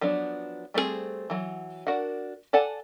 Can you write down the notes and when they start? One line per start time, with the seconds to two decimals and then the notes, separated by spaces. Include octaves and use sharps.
0.01 F3 F#3 B3 D4
0.74 G3 A3 C4 D4 G#4
1.30 E3 F#3
1.87 D4 F#4 A#4 F#5
2.53 A4 D5 F#5 G#5 A5